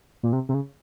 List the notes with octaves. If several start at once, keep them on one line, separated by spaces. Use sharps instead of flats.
A#2
C3
C3
C#3